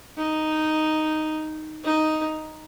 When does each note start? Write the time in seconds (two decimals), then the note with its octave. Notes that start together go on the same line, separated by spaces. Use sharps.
0.17 D#4
1.84 D#4